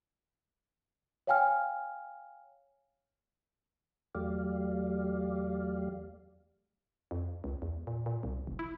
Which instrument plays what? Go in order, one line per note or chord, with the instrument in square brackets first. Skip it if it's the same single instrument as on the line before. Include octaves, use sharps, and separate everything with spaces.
[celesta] C#5 F5 G5 G#5 F6
[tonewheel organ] E2 F#3 A3 G4 D5 F5
[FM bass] F2
C#2
E2
A#2
A#2
C2
F1
E4